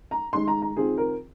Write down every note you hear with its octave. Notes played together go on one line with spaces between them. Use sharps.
A#5
D#3 G#3 D#4 C6
A#5
A#5
D#3 C4 F4 G#4
A#4